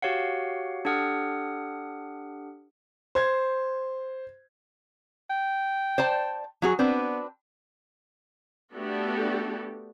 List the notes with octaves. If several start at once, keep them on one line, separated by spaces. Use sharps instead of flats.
F#4 G4 C#5 F5 F#5
D4 G4 A4 F#5 D#6 F6
C5 G#6
G5
C5 D5 A5
F#3 F#4 G#4
B3 C4 D4 B4
A3 B3 D4 F#4 G4 A4